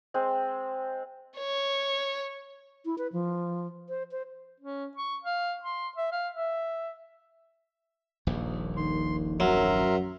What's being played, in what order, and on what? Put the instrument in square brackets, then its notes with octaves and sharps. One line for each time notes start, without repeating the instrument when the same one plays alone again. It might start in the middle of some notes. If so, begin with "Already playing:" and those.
[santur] G#3 C4 C5
[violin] C#5
[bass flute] E4
B4
F3
C5
C5
[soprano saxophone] C#4
C#6
F5
C6
E5
F5
E5
[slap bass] D#1 A#1 D#2
[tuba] D#3 [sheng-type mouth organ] C6
[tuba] F#2 [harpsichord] F#3 [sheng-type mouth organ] A#4 E5 C6